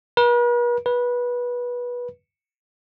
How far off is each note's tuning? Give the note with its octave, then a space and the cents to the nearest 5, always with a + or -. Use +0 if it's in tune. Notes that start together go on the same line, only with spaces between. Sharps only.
B4 -45
B4 -20